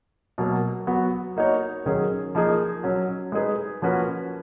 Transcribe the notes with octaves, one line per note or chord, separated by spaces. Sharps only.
B2 F#3 A#3
F#3 B3 F#4
A#3 D#4 F#4 C#5
D#3 F#3 C#4 G#4
F3 A#3 D#4 G#4
F#3 C#4 F#4
G#3 D#4 G#4 B4
F3 A#3 C#4 F#4 B4